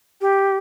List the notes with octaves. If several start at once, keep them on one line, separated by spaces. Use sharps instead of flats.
G4